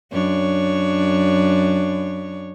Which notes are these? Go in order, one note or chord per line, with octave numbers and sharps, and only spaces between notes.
F#2 D4 C#5